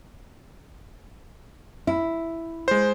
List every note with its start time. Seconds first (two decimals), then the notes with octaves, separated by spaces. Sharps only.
1.87 E4
2.68 G#3 C5